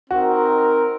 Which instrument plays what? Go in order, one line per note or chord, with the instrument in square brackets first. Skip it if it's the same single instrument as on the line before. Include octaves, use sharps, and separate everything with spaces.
[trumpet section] C4 D#4 A#4 [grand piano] F#4